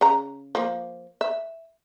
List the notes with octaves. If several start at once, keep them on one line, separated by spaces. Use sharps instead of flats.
C#3 A#5
F3 A#3
E5